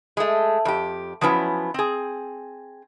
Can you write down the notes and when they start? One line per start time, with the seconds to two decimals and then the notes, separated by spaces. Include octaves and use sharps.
0.17 G#3 A3
0.65 F2 G4
1.21 F3 F#3 B3 C#4 E4
1.74 C4 G#4